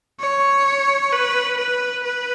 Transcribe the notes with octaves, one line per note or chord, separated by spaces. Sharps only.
C#5
B4
B4
B4